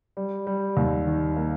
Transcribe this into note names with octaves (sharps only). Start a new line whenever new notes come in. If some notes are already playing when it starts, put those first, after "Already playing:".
G3
G3
D#2
D#3
A#3